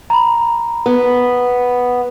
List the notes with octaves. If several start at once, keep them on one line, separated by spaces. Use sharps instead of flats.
A#5 B5
B3